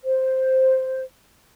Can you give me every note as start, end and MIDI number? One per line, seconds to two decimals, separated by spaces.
0.03 1.01 72